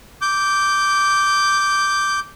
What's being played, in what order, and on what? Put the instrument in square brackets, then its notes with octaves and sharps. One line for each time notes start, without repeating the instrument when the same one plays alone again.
[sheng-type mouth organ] D6 G6